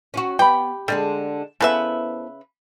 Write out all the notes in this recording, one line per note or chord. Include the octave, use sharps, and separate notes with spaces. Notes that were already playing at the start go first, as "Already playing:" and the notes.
C#4 F4 F#4
B3 G4 G5 B5
D3 G3 G#3 D4
C#3 B3 E4 A4 B4 C5 E5